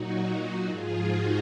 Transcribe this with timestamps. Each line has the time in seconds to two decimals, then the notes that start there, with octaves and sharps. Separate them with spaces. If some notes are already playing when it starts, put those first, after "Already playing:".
Already playing: A#2 F#3 D#4 F#4
0.25 D#4 F#4
0.67 G#2 F3 F4 G#4
1.09 D#4 F#4